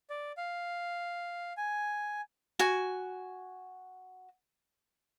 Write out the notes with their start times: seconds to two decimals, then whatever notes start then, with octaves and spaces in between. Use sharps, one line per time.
0.10 D5
0.37 F5
1.57 G#5
2.59 F#4 G#5